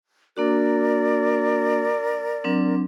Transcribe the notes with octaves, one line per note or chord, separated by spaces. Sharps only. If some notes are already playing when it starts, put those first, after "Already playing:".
A#3 D4 F#4 A#4 D5
F#3 C4 D4